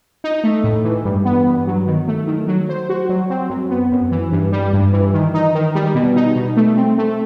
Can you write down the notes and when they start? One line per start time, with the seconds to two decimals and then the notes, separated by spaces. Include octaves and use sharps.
0.24 D#4
0.44 A3
0.64 A2
0.84 E3
1.05 G2
1.25 B3
1.46 G2
1.67 F#3
1.87 D#3
2.08 A3
2.27 D#3
2.48 F#3
2.69 C5
2.89 F#4
3.09 F#3
3.30 C4
3.50 F#2
3.70 B3
3.92 F#2
4.12 E3
4.32 G2
4.52 G3
4.73 G2
4.93 E3
5.14 D#3
5.34 D#4
5.55 D#3
5.75 G3
5.95 B2
6.16 D#4
6.36 B2
6.57 A3
6.77 C4
6.98 A3